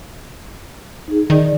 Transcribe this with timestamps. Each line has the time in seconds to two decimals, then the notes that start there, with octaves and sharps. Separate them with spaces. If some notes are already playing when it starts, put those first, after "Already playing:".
1.08 D#4 G#4
1.30 D#3 D5